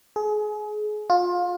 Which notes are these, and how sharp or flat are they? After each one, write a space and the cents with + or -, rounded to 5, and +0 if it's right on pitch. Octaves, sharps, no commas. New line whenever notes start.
G#4 +30
F4 +25